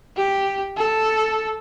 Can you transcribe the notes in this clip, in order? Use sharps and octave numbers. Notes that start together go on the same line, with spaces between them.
G4
A4